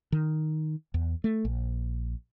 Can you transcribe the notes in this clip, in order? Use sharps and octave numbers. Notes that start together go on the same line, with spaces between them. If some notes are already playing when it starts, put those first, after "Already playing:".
D#3
E2
A3
A#1